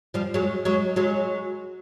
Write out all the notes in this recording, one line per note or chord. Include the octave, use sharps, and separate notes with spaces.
F3 G3
F#3 G#3
F#3 G#3
F#3 G#3